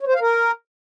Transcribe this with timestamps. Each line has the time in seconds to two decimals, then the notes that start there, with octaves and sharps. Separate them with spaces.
0.01 C#5
0.07 C5
0.14 F5
0.21 A#4